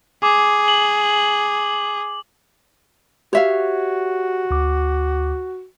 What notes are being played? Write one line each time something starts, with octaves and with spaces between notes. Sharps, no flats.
G#4 D6
F#7
F#4 G4 C#5 E5 F5
D2 D6